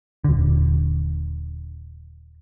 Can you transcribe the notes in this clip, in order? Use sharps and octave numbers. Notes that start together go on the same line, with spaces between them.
D#1 D3